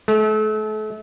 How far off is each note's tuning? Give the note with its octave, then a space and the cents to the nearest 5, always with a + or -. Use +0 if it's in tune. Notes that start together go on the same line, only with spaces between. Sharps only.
A3 -35